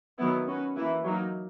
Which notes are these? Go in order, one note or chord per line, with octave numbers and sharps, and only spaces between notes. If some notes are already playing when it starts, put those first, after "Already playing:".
D#3 F#3 B3 E4
C#4 F#4 B4
E3 A#3 E4 B4
F#3 A#3 D#4